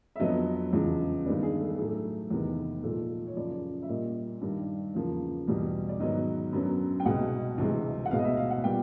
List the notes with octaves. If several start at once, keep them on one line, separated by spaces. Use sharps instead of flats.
E5
F2 D3 F#3 B3 D#5
E2 C#3 F3 G#3
G2 D#3 G#3 B3 D5
G#4
A4
A2 F#3 A3 A4
E2 C3 D#3 G#3 B3
A#2 F3 G#3 A4
C#5
F#2 C#3 F3 D5
E5
A#2 G3 A#3 D#5
G2 D#3 G3
E2 C#3 F3 A#3
E2 B2 G3
D5
G#2 D#3 F#3 B3 D#5
F#2 D3 F#3 B3
G5
C2 B2 G#3 F#5
D2 C3 E3 G#3
F#5
B2 G#3 B3 F5
D#5
E5
F5
F#5
A#2 G3 B3 G5